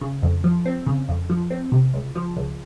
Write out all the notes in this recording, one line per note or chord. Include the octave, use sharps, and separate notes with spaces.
C#3
F2
F3
C4
C#3
F2
F3
C4
C3
C#2
F3
C#2